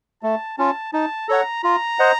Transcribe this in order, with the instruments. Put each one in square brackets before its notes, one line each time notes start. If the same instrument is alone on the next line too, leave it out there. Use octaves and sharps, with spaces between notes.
[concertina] A3 [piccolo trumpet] A5
[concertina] C#4 F4 [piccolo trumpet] A5
[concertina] D#4 [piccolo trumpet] A5
[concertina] A4 C#5 F#5 [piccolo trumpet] A#5
[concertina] F4 [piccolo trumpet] A#5
[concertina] C5 D#5 F#5